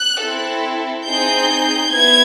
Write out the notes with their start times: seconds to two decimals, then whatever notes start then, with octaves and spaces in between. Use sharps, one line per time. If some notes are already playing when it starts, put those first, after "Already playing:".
Already playing: F#6
0.21 C4 E4 A4
1.06 C4 D#4 G#4 G6
1.92 B3 E4 G#6